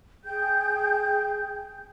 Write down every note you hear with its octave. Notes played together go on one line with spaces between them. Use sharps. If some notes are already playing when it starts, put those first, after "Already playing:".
G#4 G5 G6